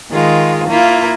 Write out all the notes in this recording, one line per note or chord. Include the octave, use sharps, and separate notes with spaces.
D#3 G#3 F4
A#3 E4 F4